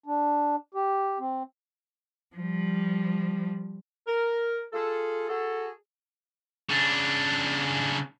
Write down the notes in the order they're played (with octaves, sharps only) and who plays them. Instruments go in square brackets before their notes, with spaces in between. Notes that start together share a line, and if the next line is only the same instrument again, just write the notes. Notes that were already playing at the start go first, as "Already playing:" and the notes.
[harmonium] D4
G4
C4
[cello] F3 G3
[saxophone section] A#4
F4 G#4 A4
F#4 G#4 A4
[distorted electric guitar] C#3 D4